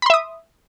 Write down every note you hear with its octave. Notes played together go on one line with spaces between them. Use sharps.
E5 B5 C6 D#6